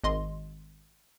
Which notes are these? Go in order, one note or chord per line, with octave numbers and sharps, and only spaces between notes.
G#1 D#5 C6